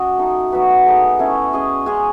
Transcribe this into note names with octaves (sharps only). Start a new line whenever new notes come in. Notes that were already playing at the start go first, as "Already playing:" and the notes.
Already playing: C#4 F#4 D#5
A3 D#4 A4
F#3 B3 F#4 B4
G#3 D#4 A4
A3 C#4 E4
C#4 G#4 D#5
G#3 C#4 G#4